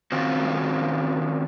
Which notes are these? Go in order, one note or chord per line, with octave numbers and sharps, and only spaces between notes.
D#3 C4 C#4 F4 F#4 C5